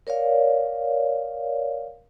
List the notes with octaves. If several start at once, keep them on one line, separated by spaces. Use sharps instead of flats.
A#4 C#5 D5 F5